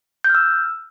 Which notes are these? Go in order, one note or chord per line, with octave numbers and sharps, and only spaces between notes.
G6
F6
E6